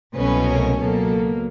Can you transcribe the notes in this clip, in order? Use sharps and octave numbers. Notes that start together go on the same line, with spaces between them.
C2 B2 F#3 A3 C#4 B4
A#4
C#2 B2 F#3 A#3 A4